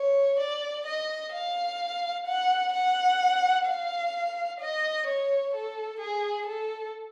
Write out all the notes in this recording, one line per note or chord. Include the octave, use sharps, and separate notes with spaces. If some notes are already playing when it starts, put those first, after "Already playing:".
Already playing: C#5
D5
D#5
F5
F#5
F#5
F5
D#5
C#5
A4
G#4
A4